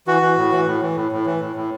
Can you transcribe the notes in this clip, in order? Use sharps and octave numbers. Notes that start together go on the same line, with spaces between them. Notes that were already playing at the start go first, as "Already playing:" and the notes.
E3 F#4
E3
A2
E3
A2
E3
A2
A2
E3
A2
A2